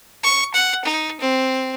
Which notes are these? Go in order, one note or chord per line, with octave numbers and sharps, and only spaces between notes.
C#6
F#5
D#4
C4